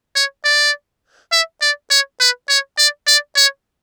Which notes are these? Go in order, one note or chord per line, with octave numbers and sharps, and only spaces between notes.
C#5
D5
E5
D5
C#5
B4
C#5
D5
D5
C#5